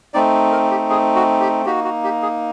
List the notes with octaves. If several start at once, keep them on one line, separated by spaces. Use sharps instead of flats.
A3 C4 D#4 D5
A#4
G4
G#4
F#4
G4
A#3 D#4 F#4 G4
F#4
G4
G#4